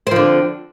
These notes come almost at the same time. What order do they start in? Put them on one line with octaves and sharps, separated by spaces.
C4 F3 D3